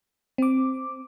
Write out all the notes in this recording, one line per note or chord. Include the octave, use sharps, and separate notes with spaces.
C4 D6